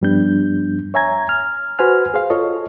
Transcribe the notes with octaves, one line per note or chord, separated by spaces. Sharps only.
G2 F3 G3 B3 D4 G6
C#5 E5 G#5 A#5 G#6
F6
F#4 B4 C5 G#5 F6
G#4 C5 F5
F4 A4 C#5 D#5